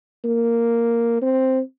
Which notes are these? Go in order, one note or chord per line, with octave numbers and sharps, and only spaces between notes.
A#3
C4